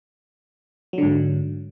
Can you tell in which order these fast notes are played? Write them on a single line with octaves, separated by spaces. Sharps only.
F#3 D3 G#2